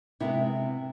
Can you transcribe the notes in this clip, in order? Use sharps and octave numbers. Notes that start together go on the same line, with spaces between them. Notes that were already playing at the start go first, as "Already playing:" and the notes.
C3 G#3 B3 E4